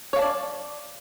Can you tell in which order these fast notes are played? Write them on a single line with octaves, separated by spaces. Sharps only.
C#5 F5 A5 D5